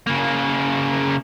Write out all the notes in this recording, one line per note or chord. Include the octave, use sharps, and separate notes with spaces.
C#3 A#3